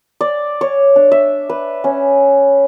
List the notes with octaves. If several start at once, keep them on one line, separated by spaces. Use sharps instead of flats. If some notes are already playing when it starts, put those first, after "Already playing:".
D5
C#5
D4
E5
B4
C#4